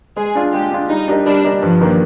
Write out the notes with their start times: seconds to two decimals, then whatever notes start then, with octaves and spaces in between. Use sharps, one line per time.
0.17 G#3 G#4
0.35 D4 F4
0.53 G#3 G4
0.72 D4 F4
0.89 G3 D#4
1.08 D4 G4 A#4 D#5
1.26 G3 D4
1.45 D4 G4 A#4 D#5
1.63 G2 F3
1.81 D#3 A#3 D4